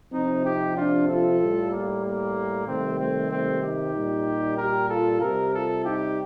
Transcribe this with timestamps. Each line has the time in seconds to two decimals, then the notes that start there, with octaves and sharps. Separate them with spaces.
0.12 C3 F3 C4 D#4
0.44 D#4 G4
0.76 D4 F4
1.08 F4 A4
1.40 A2 G3
1.72 A#3
2.04 A#3
2.67 C3 D#3 G3 A3 C4
2.99 A3 C4
3.31 A3 C4
3.62 D#4 G4
3.94 A#2 G3
4.58 G4 A#4
4.90 F4 A4
5.21 C3 G3 G4 A#4
5.53 F4 A4
5.85 D#4 G4